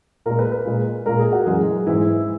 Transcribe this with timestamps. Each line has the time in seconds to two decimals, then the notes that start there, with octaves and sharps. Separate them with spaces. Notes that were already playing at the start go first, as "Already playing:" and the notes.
0.26 A#2 G#3 A#4
0.39 B4
0.52 B4
0.65 A#2 G#3
1.06 A#2 G#3 A#4
1.19 G#4
1.33 F#4
1.46 F#2 E3 G#3 G#4
1.87 G#2 E3 G#3 E4